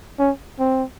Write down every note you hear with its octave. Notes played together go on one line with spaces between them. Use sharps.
C#4
C4